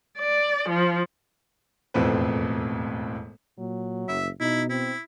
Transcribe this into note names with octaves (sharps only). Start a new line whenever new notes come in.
D5
F3
E1 F2 A2 C4 B4
A#2 F#3
F#1 E5
B2 D#4 E4
C4 E4